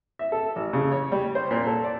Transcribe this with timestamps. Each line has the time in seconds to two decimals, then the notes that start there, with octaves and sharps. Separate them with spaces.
0.19 E5
0.32 A4
0.56 A1
0.73 C#3
0.92 C#5
1.12 G3
1.35 C5
1.51 A#2
1.67 A4
1.84 D5